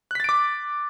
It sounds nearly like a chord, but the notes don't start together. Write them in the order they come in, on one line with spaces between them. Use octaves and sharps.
F#6 B6 A6 D7 D6